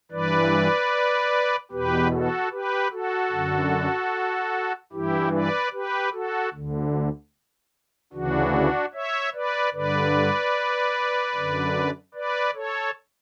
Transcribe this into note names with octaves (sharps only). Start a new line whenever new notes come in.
G2 E3 B4 D5
E2 B2 G4 B4
F#4 A4
G4 B4
F#4 A4
F#2 D3
G2 E3 E4 G4
B4 D5
G4 B4
F#4 A4
D2 D3
D2 C#3 E3 D4 F#4
C#5 E5
B4 D5
G2 D3 B4 D5
F#2 D3
B4 D5
A4 C#5